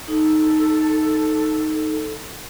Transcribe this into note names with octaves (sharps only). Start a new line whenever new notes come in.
D#4 A4